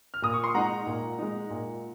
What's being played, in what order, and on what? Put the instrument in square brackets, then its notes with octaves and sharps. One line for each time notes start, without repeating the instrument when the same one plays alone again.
[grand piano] F6
A#2 D#6
C#6
C6
G#3 D#4 F#5 A#5
A#2
G#3 D#4
A#2